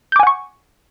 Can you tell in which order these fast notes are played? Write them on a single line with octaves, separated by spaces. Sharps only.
G6 D6 G#5 F#5 C#6